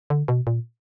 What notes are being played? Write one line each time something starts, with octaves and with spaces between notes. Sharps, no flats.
D3
B2
A#2